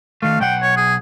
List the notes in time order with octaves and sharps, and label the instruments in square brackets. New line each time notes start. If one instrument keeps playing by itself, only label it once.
[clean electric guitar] D#3 A3 [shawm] F5
[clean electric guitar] B1 F#5 [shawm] G5
[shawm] C#5
G#4